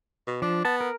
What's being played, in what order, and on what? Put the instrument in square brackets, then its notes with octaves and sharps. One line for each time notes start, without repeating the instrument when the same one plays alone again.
[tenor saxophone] B2
[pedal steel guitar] F3 [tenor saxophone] D4
[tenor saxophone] B3 [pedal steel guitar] A5
[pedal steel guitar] A#4